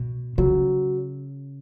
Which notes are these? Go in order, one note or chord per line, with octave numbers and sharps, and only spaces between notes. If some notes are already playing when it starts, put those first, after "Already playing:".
Already playing: B2
C#3 F#3